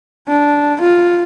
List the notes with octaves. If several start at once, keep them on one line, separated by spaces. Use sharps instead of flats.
D4
F4